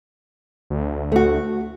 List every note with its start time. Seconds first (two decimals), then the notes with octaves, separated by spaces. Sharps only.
0.70 D2
1.12 A3 F#4